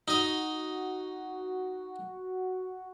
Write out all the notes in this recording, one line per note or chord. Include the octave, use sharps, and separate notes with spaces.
D#4 F#4 D#5